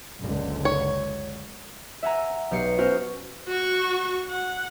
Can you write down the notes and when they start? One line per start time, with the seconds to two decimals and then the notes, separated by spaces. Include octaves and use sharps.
0.19 F#1 C#2 D3
0.65 C#5
2.03 E5 F#5 G#5 A#5
2.51 B1 G4 C7 C#7
2.78 B3 C#4 F#4 A#4 C5
3.48 F#4 C#6
4.30 F#5